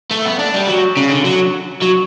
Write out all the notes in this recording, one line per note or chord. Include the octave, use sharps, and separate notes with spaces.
A3
B3
D4
G3
F#3
C#3
D3
F#3
F#3